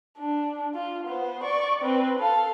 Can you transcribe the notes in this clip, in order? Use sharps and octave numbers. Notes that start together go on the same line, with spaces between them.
D4
F4
B3 C5
D5 C#6
C4 B4
A4 F5